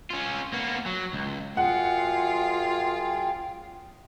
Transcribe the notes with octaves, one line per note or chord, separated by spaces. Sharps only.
C#4 F4
A#3 B3
F#3
C#2
F#2 F4 G#4 F#5 G5